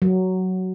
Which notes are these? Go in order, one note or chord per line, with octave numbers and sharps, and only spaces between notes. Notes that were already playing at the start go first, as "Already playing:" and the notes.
F#3